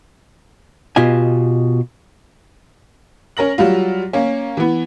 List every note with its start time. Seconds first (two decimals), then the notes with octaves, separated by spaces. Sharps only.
0.96 B2 F4 G4 D#5 G#5
3.37 C#4 A#4 A#6 F#7
3.58 F#3 G3 F4
4.13 A#3 C#4
4.57 E3 B3